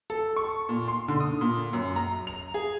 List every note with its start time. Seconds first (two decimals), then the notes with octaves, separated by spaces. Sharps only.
0.10 A4
0.36 C#6
0.69 A#2
0.88 C6
1.08 D3
1.20 D#6
1.41 A#2
1.73 F#2
1.96 A#5
2.27 F7
2.54 G#4